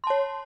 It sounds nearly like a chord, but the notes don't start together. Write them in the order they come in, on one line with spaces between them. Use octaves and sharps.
C6 A5 C#5